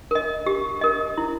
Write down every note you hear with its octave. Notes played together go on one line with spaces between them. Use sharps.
A#4 D#5
G4
A#4 D#5
E4